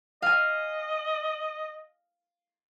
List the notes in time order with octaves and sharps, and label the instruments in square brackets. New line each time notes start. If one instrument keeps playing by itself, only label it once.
[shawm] D#5 [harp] F5 G#5